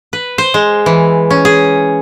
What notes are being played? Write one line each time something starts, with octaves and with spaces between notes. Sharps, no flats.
B4
C5
G#3
E3
C#4
G#4